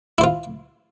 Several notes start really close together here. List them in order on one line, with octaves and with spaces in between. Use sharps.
E4 C5 F4